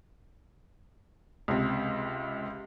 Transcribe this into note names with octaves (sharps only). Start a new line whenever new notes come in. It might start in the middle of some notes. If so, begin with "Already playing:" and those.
C#2 C3